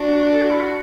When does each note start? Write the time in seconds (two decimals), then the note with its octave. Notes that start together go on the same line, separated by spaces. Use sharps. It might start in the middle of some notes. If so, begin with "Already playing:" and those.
Already playing: D4 F#4
0.31 A4
0.41 F#4
0.50 E4
0.60 F#4